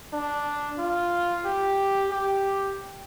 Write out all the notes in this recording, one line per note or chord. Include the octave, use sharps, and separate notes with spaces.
D4
F4
G4
G4